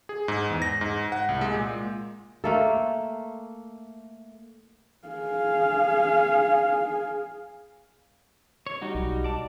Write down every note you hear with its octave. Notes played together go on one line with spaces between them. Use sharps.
G#4
G#2
E2
A#6
G#2
F#5
C2
G#3
A#2
A3 A#3 A4
G#4 F5
C#5
G3 D#4 F#4
B1
D5 A5